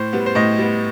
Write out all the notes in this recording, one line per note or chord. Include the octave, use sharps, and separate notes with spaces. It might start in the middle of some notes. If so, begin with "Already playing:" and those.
Already playing: A2 C5
G3 B3
C5
A2 D#5
G3 B3